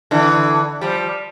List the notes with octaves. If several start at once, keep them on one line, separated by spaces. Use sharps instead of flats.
D3 E3
F3 G3